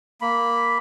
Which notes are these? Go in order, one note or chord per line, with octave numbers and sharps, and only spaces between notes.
A#3 B5